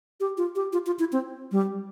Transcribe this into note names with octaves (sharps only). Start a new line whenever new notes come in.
G4
F4
G4
F4
F4
E4
C4
G3